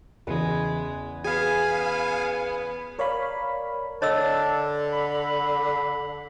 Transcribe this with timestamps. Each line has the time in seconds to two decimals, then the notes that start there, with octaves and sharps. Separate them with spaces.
0.27 E2 C#3 E3 G#3 B4
1.24 B3 G#4 F5 G#5
2.99 A#4 C#5 D5 F5 B5
4.02 D3 C#5 D#5 A5 E6
4.93 B5